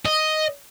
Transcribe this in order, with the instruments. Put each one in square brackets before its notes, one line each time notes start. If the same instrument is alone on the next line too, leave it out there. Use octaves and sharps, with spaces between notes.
[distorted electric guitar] D#5